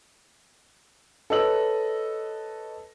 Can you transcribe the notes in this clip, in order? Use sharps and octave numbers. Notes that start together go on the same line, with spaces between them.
A4 B4 C#5 D#5 E6 F#7